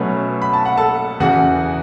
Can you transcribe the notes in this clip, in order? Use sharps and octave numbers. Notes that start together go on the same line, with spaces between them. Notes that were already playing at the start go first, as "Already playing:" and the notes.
Already playing: B2 F#3 A3 C#4 B4
B5
A5
F#5
A4 A5
E2 C#3 E3 F#4 F#5